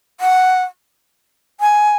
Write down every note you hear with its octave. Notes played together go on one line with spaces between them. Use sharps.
F#5
G#5